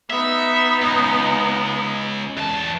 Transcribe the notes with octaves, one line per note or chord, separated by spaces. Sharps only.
B3 D#4 E5
C#2
E2 A5